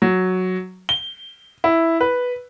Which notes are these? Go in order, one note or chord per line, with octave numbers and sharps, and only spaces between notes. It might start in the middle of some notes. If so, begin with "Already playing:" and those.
F#3
G7
E4
B4